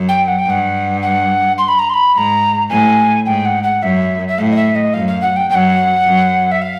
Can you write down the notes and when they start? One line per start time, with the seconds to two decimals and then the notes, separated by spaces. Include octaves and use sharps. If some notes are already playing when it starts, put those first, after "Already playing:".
Already playing: F#2
0.09 G5
0.28 F#5
0.39 G5
0.47 G2 F#5
1.02 F#5
1.58 C6
1.68 B5
1.79 A#5
1.90 C6
1.94 B5
2.14 G#2 A#5 B5
2.70 A2 G#5
3.26 G#2 G5
3.45 F#5
3.63 F#5
3.82 F#2 E5
4.28 E5
4.38 A2 F5
4.51 D#5
4.56 E5
4.75 D#5
4.94 F#2 F5
5.08 F5
5.22 F#5
5.36 G5
5.50 F#2 G5
5.55 F#5
6.06 F#2
6.51 E5
6.62 F5